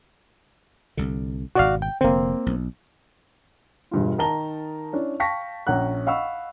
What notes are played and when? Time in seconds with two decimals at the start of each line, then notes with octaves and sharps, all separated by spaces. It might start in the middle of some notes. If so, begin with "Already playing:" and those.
0.97 C2 D3
1.55 G#1 B2 F#4 D5 F5
1.82 G5
2.01 F1 D3 A#3 C4
2.46 B1
3.91 E1 G2 F4
4.18 D#3 D#4 A#4 A5 A#5 G7
4.93 C#4 D4 E4
5.20 F5 G5 A5 C#6 A#6 B6
5.67 A#1 C#4 F#5 A#5 F#6
6.07 D#5 F5 F#5 B5 C#6 E6